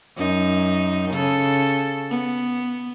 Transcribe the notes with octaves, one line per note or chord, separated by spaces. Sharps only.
F#2 D#4
C#3 A4
B3